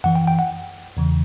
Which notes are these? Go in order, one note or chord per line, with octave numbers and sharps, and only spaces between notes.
F#2 E3 F#5
G5
G5
F#5
E2 C#3 E3